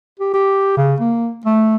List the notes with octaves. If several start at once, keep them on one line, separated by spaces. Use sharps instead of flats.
G4
G4
C#3
A#3
A3